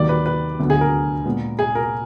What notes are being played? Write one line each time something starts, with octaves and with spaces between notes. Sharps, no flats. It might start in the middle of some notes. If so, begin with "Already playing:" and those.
Already playing: D#2 D#3 F#3 D5
B4
B4
D2 D3 F#3 B3
G#4
A#4
A#2 G#3 B3
G#4
A#4